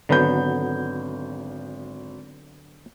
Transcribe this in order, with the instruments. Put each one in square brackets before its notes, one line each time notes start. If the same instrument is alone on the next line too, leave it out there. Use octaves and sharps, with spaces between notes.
[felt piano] G#1 G6 [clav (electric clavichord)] D3 F#3 B3